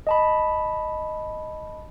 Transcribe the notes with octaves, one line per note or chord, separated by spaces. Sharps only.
D#5 A5 B5